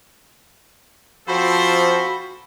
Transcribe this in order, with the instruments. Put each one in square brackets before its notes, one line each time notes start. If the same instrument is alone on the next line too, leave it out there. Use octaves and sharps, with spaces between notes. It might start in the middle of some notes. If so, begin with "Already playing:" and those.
[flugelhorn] F3 [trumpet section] C4 A4 C5 [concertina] F#4 B5